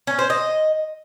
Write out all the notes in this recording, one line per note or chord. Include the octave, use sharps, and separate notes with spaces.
C#4
C5
D#5